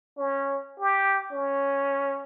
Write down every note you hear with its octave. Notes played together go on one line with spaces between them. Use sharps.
C#4
G4
C#4